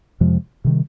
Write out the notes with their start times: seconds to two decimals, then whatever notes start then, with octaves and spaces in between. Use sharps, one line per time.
0.20 F2 C3 F3 G#3
0.64 C3 D#3 G3